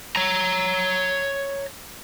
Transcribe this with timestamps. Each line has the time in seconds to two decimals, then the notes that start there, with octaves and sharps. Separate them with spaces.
0.16 C#5 A#5